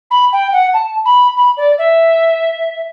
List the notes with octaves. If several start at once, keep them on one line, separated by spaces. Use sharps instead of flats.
B5
G5
F#5
A5
B5
B5
D5
E5